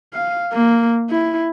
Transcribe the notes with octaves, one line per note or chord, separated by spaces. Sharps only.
F5
A#3
E4